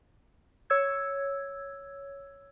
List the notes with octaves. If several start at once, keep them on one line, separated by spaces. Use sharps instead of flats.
C#5 E6 G#6